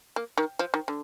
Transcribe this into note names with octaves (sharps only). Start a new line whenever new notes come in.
A#3
D#3
F3
D#3
D3